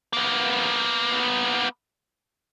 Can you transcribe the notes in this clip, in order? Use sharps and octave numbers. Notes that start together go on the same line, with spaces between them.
A#3 B3